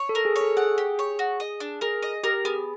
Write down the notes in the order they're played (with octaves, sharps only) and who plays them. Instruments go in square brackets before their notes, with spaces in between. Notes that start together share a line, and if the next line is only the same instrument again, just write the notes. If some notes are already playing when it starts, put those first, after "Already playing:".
Already playing: [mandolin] C#5
[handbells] A4
[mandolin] A#4
[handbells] G#4
[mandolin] C#5
[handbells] A4
[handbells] G#4 [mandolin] F#5
[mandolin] G4
C#5
F#4
D#5
D4
[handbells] G#4 [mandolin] A#4
[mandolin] D#5
[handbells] G4 [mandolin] A#4
[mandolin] B3 [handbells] G#4